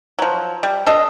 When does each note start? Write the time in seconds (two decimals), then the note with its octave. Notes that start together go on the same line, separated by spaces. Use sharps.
0.19 F3 F#3
0.63 G3
0.86 D4 A4 D#5